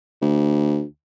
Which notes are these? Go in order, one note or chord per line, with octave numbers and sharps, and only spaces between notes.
D2